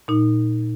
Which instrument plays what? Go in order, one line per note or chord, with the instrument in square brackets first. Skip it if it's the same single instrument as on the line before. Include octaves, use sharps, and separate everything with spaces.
[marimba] A#2 D#4